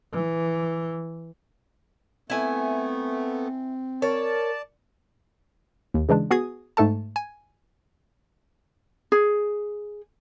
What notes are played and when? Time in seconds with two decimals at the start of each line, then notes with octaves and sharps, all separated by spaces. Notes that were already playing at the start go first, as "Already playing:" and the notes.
0.13 E3
2.30 A3 B3 C4 E4 G#5
4.02 A#4 C#5 D5 A5
5.94 D#2
6.09 C#3 E3 G#3 D4
6.31 B3 F#4 G#4 D#6 G#6
6.77 G#2 A3 A4 A5
7.16 G#5
9.12 G#4